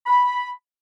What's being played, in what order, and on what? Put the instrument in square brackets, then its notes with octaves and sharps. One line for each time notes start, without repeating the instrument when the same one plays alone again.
[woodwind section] B5